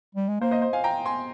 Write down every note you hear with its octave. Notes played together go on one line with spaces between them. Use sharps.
G3
G#3
A#3 C5
C5 D#5
C5
F5 G#5
G5 A#5
G#5 C6